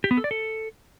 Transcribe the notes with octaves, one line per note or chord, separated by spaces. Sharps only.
G4
B3
A4
D5
A4